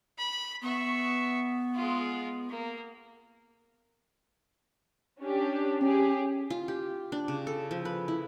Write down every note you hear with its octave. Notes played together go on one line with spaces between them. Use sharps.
B5
B3 E5 C#6
G#3 F4
A#3
C#4 D4 G4
C#4 G4 G#4
F4
G4
D4
C#3
A4
F3
B4
E4